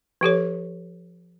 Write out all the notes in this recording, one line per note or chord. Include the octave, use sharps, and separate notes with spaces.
F3 G4 A4 C#5